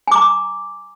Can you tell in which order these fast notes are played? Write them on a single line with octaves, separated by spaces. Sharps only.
G#5 D6 A#5